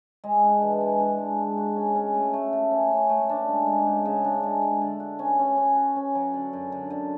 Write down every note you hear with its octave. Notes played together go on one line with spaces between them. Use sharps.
G#3
D4
E3
G#3
D4
G#3
G#3
F#4
C#4
C#4
A3
A3
A3
C#4
C#4
A3
D4
G#3
G#3
C#3
C#3
D4
G#3
G#3
D3
F#4
C#4
C#4
C#4
F#4
C#4
F#3
D3
F#2
D3
D3